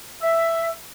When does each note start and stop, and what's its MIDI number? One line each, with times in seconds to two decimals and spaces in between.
0.21 0.70 76